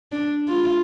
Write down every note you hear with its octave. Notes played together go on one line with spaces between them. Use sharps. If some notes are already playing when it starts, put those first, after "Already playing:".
D4
F4